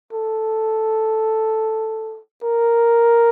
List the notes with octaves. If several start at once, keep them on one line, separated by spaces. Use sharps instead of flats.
A4
A#4